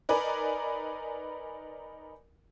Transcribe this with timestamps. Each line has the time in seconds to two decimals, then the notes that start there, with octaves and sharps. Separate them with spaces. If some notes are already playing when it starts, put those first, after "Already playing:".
0.09 D#4 A#4 B4 D5 G#5